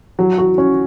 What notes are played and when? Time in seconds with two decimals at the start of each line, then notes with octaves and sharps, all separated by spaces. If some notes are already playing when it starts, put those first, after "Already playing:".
0.19 F#3
0.38 F#4
0.58 C#4